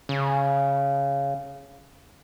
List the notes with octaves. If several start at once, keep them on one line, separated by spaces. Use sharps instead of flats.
C#3